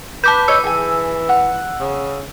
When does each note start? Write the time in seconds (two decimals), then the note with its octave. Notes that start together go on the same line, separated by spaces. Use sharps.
0.24 B4 A5 D6 G6
0.48 C#5 D#5 E6
0.64 E3 G#4 G#5
1.29 F#5
1.80 C#3